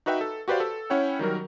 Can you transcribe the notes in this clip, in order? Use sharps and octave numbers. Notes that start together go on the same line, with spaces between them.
D#4 F#4 B4 E5 G5
A4
F#4 G4 B4 C5 D5 F5
A4
C#4 E4 C#5 F#5 G5
D#3 F#3 G3 A#4